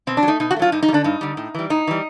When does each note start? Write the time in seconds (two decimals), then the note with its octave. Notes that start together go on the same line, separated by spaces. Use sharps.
0.07 B2 C4
0.17 D4
0.23 F#3
0.27 A3 D#4
0.40 B2 D#4
0.51 F#4
0.56 A3
0.59 F#3 F4
0.72 G2 D#4
0.83 D#4
0.88 G3
0.92 D3 D4
1.04 G2 D#4
1.21 D3 G3
1.37 A2
1.55 E3 G3
1.70 A2 D#4
1.87 E3 G3